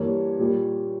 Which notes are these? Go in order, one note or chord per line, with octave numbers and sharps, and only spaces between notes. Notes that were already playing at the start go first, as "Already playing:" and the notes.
Already playing: G2 E3 A#3 C#5
A#2 G3 A#3